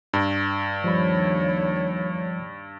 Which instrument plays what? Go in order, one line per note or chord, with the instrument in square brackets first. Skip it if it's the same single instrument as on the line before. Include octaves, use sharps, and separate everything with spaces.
[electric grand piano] G2
[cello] D#2 C#5 [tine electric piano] F3 G3 B5